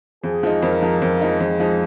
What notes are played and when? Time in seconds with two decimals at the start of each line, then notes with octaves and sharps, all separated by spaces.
0.23 F2 G#4
0.43 F3 G#3 D#4
0.62 F2 A#4
0.82 F3 G#3 D#4
1.01 F2 A#4
1.21 F3 G#3 D#4
1.40 F2 G#4
1.60 F3 G#3 D#4